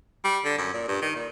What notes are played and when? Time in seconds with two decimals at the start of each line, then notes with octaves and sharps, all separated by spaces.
0.25 G3
0.44 D3
0.58 F#2
0.74 A#2
0.88 G2
1.02 D#3
1.15 A#2